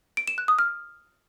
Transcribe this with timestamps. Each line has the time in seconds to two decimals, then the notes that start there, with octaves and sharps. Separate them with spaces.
0.17 D7
0.28 E7
0.38 F#6
0.48 D#6
0.59 F6